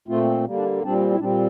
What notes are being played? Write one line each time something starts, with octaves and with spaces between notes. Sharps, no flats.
A#2 A3 C4 F4
D3 G3 A#3
D4
E4
A#2 G3 C4 D4
E4
A#2 G3 C4 D4